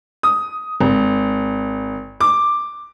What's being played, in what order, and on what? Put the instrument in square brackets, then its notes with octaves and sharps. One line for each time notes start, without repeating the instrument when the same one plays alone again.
[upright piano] D#6
G#1
D6